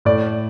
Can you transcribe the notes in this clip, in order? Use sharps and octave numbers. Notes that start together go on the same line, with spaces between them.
A2 D5